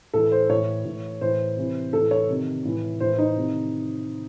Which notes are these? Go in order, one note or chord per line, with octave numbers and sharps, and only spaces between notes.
A2 E3 A4
C5
A2 E3 C#5
A2 E3
A2 E3 C5
C3 E3
A2 E3 A4
C#5
C3 D#3
A2 E3
A2 E3 C5
D#4
C3 D#3